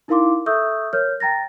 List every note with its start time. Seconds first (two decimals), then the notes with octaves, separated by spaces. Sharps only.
0.08 D#4 E4 A#4 F5 C6 D6
0.46 A4 E5 C#6 D#6 E6 G6
0.93 A#4 C#5 F6 G6
1.20 G5 A#5 A6 A#6